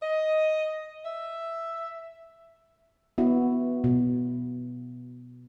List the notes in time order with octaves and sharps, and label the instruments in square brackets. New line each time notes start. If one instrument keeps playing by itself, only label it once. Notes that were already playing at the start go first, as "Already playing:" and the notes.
[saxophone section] D#5
E5
[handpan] B3 E4 F#4
B2